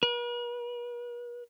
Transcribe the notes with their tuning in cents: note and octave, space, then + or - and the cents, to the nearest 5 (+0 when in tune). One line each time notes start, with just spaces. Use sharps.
B4 -45